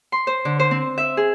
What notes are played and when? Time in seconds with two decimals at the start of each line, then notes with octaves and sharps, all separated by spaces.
0.12 C6
0.27 C5
0.45 D3
0.59 C5
0.71 C4
0.98 E5
1.17 G#4